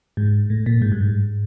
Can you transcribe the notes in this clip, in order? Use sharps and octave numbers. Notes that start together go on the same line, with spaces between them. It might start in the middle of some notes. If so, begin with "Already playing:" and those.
G#2
A2
A#2
G#2
G2
G#2